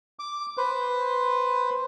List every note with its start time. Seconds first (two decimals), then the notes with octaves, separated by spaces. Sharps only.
0.19 D6
0.57 B4 C5